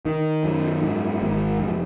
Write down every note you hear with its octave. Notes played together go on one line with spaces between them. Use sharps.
D#3
F#2
G#2
G#1
F1